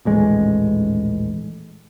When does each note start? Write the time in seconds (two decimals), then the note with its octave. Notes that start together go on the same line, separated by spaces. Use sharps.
0.05 D#1 A1 G#3